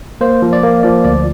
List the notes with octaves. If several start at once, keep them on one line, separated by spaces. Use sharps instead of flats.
A#3 C5
F3
D5
A#3
F3 D5
D2 D5